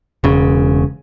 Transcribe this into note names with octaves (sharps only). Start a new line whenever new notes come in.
E1 C#3